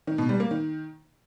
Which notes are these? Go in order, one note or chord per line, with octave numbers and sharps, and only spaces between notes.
D#3
B2
G3
A#3
D#3